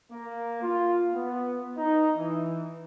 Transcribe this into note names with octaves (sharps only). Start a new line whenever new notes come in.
A#3
F4
B3
D#4
E3